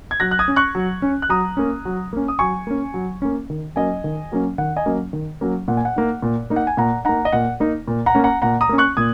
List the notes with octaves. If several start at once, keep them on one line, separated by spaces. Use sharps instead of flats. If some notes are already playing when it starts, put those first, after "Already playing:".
G#6
F#3 F#6 A#6
F#6
D#6 G#6
C#4
C#6 F#6
F#3
C#4
F#6
F#3 A#5 D#6
A#3 C#4
F#3
A#3 C#4
D#6
F#3 G#5 C#6
A#3 C#4
F#3
A#3 C#4
D#3
F#3 A#3 C#4 D#5 G#5
D#3
F#3 A#3 C#4
D#3 F#5
D#5 G#5
F#3 A#3 C#4
D#3
F#3 A#3 C#4
A#2 F#5
G#5
F#5
A#3 D#4
A#2
A#3 D#4
F#5
G#5
A#2 F#5 A#5
A#3 D#4 F#5 A#5
D#5
A#2 F#5
A#3 D#4
A#2
F#5 A#5
A#3 C#4
F#5 A#5
A#2 F#5 A#5
A#5 D#6
A#3 C#4
C#6 F#6
A#2 D#6 G#6